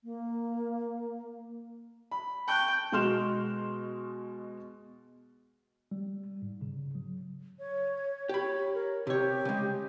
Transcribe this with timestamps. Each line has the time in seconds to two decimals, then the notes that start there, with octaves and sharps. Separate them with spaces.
0.04 A#3
2.11 B5
2.48 G5 A5 C#6 F#6
2.92 B2 G#3 F#4 C6 F6 E7
5.91 G3
6.42 G#2
6.61 C#3
6.95 F#3
7.59 C#5
8.29 G4 C#5 B5
8.75 A#4
9.07 C3 G4 C#5
9.45 C#3 G#3